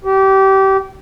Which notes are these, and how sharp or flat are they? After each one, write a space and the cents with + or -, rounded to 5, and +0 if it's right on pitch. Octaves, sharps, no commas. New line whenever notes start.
G4 -25